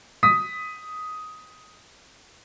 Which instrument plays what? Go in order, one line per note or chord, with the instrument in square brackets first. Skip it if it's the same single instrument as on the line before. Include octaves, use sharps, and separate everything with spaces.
[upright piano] D#6 B6